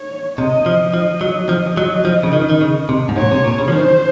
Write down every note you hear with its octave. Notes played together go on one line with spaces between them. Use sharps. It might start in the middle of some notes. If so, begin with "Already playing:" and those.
Already playing: C#5
C3 D#5
F3
F3 D#5
F#3
F3
F#3
F3
C#3
D#3
D#3
C#3
C3
G#2
A#2 C#5
C3
A#2
C#3
F3
D#3 C5